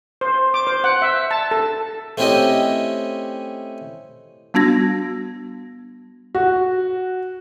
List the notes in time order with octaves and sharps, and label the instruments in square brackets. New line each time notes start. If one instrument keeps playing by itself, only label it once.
[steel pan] C5
D6
C5
F#5
E5
A5
A4
[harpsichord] A3 C4 C#4 E4 G4 D#5
[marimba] G3 B3 D4 F#4 G#6 A#6
[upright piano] F#4